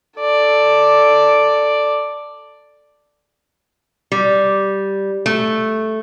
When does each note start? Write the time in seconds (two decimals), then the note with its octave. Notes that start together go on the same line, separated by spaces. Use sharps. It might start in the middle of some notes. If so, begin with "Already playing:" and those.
0.20 A4 D5
4.12 G3
5.26 A3